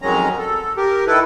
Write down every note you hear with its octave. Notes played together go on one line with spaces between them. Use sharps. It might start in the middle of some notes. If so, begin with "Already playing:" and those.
F2 D#3 F#3 G#3 C#4 A#5
A4
G4 A#4
D#3 E4 A4 B4